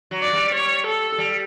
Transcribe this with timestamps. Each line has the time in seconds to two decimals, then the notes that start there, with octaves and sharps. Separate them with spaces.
0.11 F#3
0.22 D5
0.33 G3
0.54 C#5
0.87 A4
1.18 G3